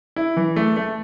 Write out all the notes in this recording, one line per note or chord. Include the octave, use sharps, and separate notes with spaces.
E4
E3
A3
A3